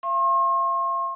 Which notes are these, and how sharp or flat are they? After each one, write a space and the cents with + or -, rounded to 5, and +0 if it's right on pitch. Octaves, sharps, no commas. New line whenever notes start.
F5 -40 C6 +45